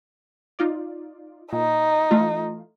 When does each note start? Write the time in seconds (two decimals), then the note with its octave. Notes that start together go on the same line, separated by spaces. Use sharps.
0.59 D#4 F4 D5
1.52 A#2 D#4
2.11 E3 A3 F4